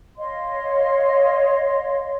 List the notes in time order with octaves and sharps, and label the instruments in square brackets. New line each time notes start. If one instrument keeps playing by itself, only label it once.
[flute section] C#5 D#5 F5 C6